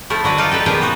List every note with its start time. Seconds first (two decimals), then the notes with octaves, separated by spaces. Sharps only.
0.10 F3 A3 E4
0.24 D3 F#3 F#4 B4
0.38 D#4 F4 D5 F5
0.51 G4 A4 B4
0.66 A#2 F3 B3 G#4 G5
0.81 D#4 F#4